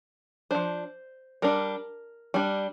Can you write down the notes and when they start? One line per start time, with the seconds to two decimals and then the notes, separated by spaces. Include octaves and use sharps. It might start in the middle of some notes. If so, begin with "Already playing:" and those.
0.51 F3 D4 C5
1.42 G3 D4 A#4
2.34 G3 D4